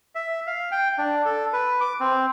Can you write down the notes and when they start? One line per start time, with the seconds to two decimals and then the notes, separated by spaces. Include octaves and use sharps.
0.15 E5
0.47 F5
0.72 G5
0.98 D4
1.25 A4
1.53 B4
1.81 D6
2.00 C4